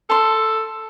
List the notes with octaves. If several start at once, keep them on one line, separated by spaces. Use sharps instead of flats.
A4 A5 C6